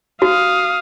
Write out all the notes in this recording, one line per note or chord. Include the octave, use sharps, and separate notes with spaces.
F#4 F5 D#6